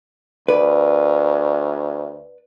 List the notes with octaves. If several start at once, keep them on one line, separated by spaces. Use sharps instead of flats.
D2 B4 D5